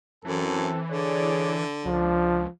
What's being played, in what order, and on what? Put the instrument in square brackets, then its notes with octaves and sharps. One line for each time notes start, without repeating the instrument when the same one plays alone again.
[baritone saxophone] F#2 [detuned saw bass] E3 [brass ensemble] C4 A4
[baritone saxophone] D3 [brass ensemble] G#4 C#5 D5
[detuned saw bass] C#2 [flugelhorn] F3 [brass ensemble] D4